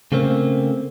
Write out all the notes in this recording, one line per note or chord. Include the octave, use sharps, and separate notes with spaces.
C#3 A3 A#3 C4